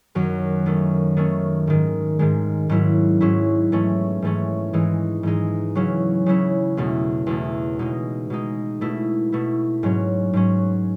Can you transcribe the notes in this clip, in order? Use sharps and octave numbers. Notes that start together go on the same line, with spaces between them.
F#2 D#3 F#3
D#3 A3 C#4
D#3 A3 C#4
G#2 D#3 G#3
G#2 D#3 G#3
G#2 F#3 C#4 E4
G#2 F#3 C#4 E4
G#2 E3 A3 C#4
G#2 E3 A3 C#4
G#2 E3 G#3 D#4
G#2 E3 G#3 D#4
C#3 F#3 C#4 E4
C#3 F#3 C#4 E4
E2 B2 A3
E2 B2 A3
B2 G#3 D#4
B2 G#3 D#4
B2 A3 E4
B2 A3 E4
G#2 F#3 C#4
G#2 F#3 C#4